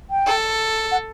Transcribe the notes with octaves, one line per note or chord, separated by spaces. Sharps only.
G5
A4
F#5